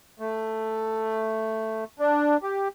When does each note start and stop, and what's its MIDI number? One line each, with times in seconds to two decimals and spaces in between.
0.19 1.84 57
1.99 2.37 62
2.43 2.68 67